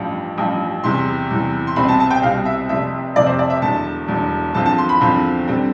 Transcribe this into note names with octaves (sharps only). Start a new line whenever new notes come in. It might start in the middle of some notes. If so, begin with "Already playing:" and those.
Already playing: A1 G2 F3
A1 G2 F3
E2 C3 E3 C6
E2 C3 E3
C6
C2 B2 G3 C4 B5
A5
A5
G5
C2 B2 G3 C4 F5
E5
F1 F2 C3 E5
F1 F2 C3 D5
C5
D5
E5
E1 E2 D3 A5
E1 E2 D3
E2 D3 F3 C4 A5
A5
C6
B5
E2 D3 F3 C4
D3 G3 C4